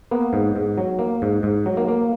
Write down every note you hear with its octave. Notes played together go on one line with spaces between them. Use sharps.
A#3 B3
G#2
G#2
F#3
A#3
G#2
G#2
F#3
A#3
A#3